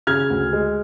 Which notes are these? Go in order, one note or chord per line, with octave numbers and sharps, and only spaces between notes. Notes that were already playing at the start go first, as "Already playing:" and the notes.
C#3 F6 G#6
D2
G#3